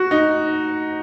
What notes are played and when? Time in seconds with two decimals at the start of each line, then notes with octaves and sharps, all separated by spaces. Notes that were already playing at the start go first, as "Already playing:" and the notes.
Already playing: F#4
0.11 D#4